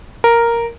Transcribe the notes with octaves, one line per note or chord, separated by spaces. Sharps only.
A#4